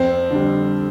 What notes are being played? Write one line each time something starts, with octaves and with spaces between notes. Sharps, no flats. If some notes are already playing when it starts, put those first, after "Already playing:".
Already playing: F2 C4
D3 G3